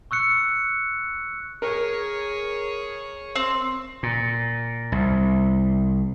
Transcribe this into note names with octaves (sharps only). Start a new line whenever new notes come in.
C#6 E6 F#6 C#7
G#4 A#4 C#5
C4
A#2
C2